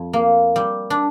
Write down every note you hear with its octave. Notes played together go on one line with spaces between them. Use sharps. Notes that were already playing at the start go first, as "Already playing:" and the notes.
Already playing: F2
A#3
G3
D4